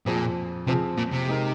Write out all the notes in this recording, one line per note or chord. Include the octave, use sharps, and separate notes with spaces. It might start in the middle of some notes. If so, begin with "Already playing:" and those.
F2 A#2 F3 C4 G#4
F2 C3 F3 C4 G#4
A#2
C3
G#3 D#4 A#4